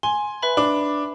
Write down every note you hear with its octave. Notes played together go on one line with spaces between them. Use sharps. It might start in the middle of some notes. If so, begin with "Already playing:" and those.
G#5 C6
B4 E5 B5
D4 B5 D6